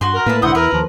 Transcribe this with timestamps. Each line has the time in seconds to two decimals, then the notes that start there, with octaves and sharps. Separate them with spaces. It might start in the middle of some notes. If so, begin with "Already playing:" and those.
0.01 G2 F#4 F#5 C6
0.13 A#4
0.26 A2 A#3 B4 E5 A5
0.42 B1 G#2 D3 E4 C5 F#5 D#6
0.55 E2 A#4 B4
0.72 D#2 F3